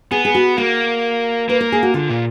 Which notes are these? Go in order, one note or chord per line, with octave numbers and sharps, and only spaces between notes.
B3 G#4
G#4
F#4
A#3 F#4
A#3 B4
A#4
G#4
F#4
D3 F4
A#2